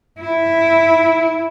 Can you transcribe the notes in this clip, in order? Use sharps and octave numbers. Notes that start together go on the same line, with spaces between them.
E4